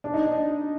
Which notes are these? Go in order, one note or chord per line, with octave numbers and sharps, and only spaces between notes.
D4
D#4
D4